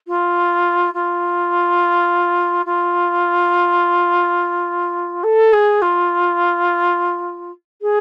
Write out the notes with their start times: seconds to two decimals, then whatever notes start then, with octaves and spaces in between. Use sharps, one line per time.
0.07 F4
0.94 F4
2.65 F4
5.23 A4
5.53 G#4
5.82 F4
7.82 G#4